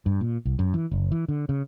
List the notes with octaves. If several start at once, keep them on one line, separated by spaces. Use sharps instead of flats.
G2
A#2
C2
F#2
E3
F#1
E3
D3
C#3